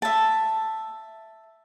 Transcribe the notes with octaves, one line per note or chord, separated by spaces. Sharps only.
E5 A5